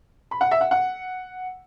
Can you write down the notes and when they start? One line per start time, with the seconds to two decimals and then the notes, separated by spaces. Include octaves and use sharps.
0.31 B5
0.41 F#5
0.51 E5
0.61 F#5
0.71 F#5